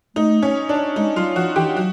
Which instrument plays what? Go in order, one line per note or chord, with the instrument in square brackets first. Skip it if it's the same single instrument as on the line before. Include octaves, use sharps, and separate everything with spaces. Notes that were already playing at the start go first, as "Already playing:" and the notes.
[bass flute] A3 [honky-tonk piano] D#4
[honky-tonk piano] C#4
D4
[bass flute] G#3 [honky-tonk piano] D#4
[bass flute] F#3 [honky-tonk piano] F4
[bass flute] F3 [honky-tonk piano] F#4
[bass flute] E3 [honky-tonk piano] G4
[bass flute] F#3 [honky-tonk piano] F#4